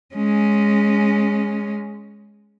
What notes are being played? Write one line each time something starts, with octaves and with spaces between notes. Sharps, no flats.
G#3 C#4